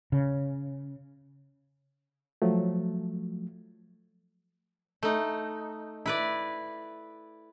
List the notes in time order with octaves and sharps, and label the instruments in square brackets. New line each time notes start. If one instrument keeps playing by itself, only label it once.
[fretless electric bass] C#3
[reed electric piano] F3 F#3 A3
[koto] A3 D#4
E4 B4 D5